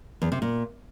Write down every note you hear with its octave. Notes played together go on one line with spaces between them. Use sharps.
E2
C3
A#2